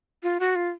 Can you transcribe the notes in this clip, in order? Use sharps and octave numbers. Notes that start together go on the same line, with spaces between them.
F4
F#4
F4